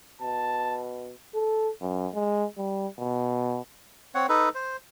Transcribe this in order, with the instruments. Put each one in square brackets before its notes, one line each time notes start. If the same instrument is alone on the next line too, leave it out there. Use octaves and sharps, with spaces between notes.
[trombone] B2 [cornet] A5
[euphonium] A4
F#2
G#3
G3
B2
[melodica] C4 C#5 F#5
D#4 A4 B4
C5